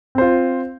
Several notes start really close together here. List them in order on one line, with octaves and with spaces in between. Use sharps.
C4 C5 F4